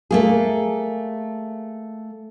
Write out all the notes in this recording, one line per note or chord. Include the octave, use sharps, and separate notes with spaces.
A3 A#3 G#4